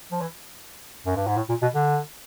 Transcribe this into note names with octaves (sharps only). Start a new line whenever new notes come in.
F3
E3
F#2
G2
G#2
A2
A#2
B2
D3